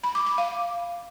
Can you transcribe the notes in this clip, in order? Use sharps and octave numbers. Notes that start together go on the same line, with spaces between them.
B5
D6
D6
F5